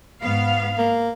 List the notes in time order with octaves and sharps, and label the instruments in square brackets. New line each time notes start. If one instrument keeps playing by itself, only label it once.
[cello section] G#2 B3 F5
[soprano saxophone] A#3